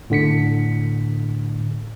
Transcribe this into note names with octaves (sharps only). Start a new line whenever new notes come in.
A2 D3 B6 C#7